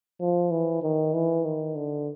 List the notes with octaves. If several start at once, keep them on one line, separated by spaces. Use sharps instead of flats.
F3
E3
D#3
E3
D#3
D3